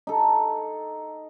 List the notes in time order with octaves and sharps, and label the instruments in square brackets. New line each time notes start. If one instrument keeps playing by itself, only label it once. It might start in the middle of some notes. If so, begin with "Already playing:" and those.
[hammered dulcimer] D#4 A4